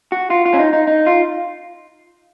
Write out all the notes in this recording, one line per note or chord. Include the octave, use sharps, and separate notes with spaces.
F#4
F4
F4
C#4
D#4
D#4
D#4
F4